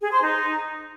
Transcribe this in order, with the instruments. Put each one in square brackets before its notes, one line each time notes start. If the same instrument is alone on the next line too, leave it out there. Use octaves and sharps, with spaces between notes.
[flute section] G#4
C5
D#4